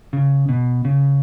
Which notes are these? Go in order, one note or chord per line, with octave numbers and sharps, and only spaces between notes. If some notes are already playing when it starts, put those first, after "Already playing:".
C#3
B2
C#3